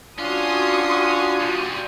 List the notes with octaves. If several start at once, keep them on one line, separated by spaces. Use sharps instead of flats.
C#4 D4 F4 F#4 C6 D#6
A#2 G3